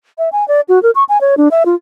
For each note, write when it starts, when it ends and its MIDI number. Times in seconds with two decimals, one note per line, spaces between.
0.18 0.29 76
0.32 0.47 80
0.48 0.61 74
0.69 0.82 66
0.83 0.91 70
0.95 1.04 85
1.09 1.20 80
1.21 1.35 73
1.37 1.48 62
1.51 1.63 76
1.66 1.75 65